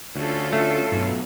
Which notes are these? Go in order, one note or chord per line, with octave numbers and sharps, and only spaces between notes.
D2 C#4 F4 A4
A3
B1 G2